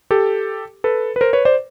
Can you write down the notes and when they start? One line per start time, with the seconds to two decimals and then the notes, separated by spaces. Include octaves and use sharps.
0.11 G4 A4
0.84 A4 B4
1.16 B4
1.21 A#4 C5
1.33 B4 C#5
1.45 C5 D5